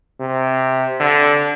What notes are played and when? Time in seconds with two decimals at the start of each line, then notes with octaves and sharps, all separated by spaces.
0.20 C3
1.00 D3